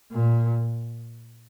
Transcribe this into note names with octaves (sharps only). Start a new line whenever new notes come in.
A#2